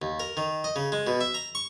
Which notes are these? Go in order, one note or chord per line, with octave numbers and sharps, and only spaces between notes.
D#2
A#4
D#3
D#5
C#3
G#3
B2
E5
A#5
C#6